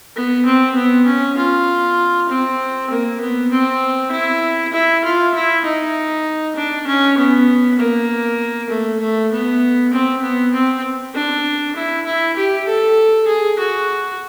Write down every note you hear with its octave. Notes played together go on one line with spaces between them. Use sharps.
B3
C4
B3
C#4
F4
C4
A#3
B3
C4
E4
E4
F4
E4
D#4
D4
C#4
B3
A#3
A3
A3
B3
C4
B3
C4
D4
E4
E4
G4
A4
G#4
F#4